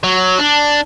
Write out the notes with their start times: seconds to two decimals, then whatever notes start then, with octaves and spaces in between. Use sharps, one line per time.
0.04 F#3
0.39 D4